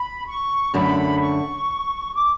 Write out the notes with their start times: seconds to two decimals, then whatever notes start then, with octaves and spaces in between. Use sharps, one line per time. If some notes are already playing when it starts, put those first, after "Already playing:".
Already playing: B5
0.27 C#6
0.74 F#2 D3 A3 B5
1.21 C#6
2.15 D6